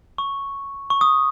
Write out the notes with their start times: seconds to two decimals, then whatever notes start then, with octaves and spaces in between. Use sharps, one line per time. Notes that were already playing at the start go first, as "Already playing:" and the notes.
0.18 C#6
0.90 C#6
1.01 D#6